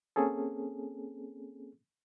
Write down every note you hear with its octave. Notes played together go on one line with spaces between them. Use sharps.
A#3 C4 C#4 G#4 A4